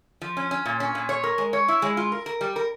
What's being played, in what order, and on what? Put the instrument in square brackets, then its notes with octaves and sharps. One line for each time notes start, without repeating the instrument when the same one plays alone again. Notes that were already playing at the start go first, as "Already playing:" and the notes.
[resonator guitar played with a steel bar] F3
C#4
C#4
A#2
C#4
A#2
C#5
A#4
G#3
C#5
E4
G#3
F4
A#4
A#4
G3
A#4